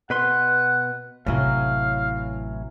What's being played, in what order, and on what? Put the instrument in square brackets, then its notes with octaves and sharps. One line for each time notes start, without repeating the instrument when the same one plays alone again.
[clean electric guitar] B2 B4 C6 [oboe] F#5
[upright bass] A1 C3 [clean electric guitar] A2 E3 F#3 [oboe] F5